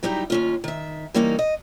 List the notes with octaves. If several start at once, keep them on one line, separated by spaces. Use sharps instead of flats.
F#3 G3 D#4 E4 G4
D#2 C#4 F4
D#3 E5
E3 G3 A#3 C#4 D#4
D#5